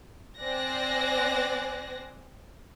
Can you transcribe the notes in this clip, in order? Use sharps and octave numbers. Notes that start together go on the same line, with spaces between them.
C4 C5 D5 G#5 F#6 A#6